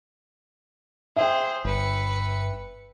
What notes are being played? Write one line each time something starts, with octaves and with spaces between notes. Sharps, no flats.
G#4 C5 E5 G5
G1 B4 C#7